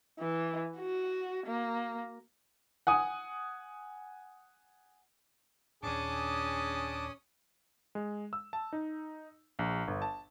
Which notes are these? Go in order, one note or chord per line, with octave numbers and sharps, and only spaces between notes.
E3
F#4
A#3
F#5 G#5 D#6
D#2 A#2 C#4 D4 G#4 A5 D6 D#6
G#3
E6
A5
D#4
A#1
G1
A5